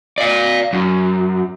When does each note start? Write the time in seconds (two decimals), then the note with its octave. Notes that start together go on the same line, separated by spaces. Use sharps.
0.18 D5 F5
0.73 F#2